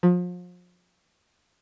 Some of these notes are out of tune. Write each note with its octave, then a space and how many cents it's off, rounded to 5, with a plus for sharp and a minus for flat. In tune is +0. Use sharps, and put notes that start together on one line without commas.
F3 +35